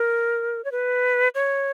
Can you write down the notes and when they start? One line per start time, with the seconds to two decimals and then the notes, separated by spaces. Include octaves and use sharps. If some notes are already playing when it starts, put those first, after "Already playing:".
Already playing: A#4
0.65 C#5
0.72 B4
1.35 C#5